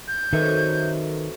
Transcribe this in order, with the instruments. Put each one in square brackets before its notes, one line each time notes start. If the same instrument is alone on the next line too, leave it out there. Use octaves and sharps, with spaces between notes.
[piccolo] G6
[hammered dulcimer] F#2 C3 [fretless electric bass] D#3 [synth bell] A4 B4 E5